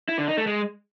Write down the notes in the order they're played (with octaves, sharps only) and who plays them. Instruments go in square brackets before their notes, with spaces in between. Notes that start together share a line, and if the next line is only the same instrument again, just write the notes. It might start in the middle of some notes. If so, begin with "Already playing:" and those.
[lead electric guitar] E4
D3
D#4
A3
G#3